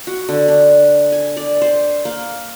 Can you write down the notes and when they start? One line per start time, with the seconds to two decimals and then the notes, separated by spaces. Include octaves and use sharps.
0.07 F#4
0.29 D3
0.48 D4
1.12 G#5
1.37 D5
1.62 C5
2.05 A#3